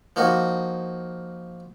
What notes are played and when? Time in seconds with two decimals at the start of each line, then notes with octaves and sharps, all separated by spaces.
0.16 F3 A#3 D#4 F#4